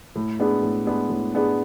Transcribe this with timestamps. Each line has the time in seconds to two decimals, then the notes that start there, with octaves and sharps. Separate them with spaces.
0.16 A2
0.39 G#3 B3 D4 G#4
0.63 A2
0.87 G#3 B3 D4 G#4
1.10 A2
1.34 G#3 B3 D4 G#4